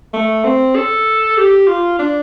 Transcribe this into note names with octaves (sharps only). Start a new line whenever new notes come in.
A3
C4
A4
G4
F4
D4